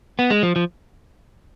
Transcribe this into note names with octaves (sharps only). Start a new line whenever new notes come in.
B3
G#3
F3
F3